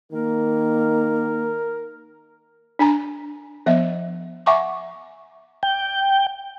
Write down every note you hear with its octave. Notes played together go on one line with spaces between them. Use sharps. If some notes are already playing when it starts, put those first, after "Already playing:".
D#3 A#3 A#4
D4 G#5 A#5
F3 B3 D#5 E5
E5 F#5 G#5 A#5 C#6 D6
G5